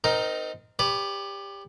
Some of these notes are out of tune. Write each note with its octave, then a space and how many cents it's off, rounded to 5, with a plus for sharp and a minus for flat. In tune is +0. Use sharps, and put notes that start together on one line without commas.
C4 -25 D#4 +0 A#4 +0
G4 +20 B4 +0 D5 -45